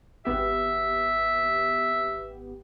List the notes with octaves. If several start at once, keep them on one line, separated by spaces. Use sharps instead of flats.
G#1 B3 G4 E5